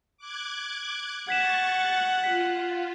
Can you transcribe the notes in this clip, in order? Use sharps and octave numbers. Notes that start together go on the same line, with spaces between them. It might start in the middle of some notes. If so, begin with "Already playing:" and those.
D6 F#6 G#6
F#5 C#6 G#6 A6 B6 E7
F4 B6